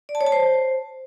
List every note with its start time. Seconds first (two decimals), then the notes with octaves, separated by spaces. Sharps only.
0.09 D5
0.15 A5
0.21 C#5
0.26 A5
0.32 C5